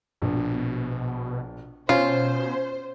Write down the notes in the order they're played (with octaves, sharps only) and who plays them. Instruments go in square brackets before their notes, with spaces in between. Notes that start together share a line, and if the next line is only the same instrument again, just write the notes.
[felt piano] A#1 [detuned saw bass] B2
[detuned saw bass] B2 [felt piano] C#4 [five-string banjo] F4 [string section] C5